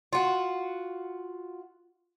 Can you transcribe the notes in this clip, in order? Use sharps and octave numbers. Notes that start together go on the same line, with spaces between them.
F4 F#4